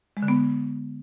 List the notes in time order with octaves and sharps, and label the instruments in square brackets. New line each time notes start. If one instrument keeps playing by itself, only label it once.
[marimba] G#3
D3
B3